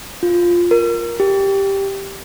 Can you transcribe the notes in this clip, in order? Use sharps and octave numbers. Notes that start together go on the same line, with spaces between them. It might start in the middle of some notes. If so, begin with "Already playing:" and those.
F4
A#4
G4